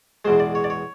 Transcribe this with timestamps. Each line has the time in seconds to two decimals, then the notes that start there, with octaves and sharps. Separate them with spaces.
0.25 E2 B2 G#3 C5
0.40 D5
0.55 C#5
0.64 D5
0.70 C#5